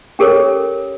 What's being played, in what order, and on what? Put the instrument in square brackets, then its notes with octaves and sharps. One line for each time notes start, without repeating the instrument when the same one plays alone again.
[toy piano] C#4 G4 A4 A#4 C#5